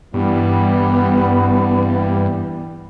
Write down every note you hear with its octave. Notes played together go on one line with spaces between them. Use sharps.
G2 E3 G3 B3